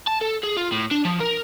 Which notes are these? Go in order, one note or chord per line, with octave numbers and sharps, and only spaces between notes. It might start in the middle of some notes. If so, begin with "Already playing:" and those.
A5
A4
G#4
F4
A2
D4
F3
A#4